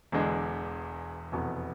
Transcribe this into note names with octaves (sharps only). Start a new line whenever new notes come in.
E1 E2 D3 G#3 D4
F1 E2 B2 B3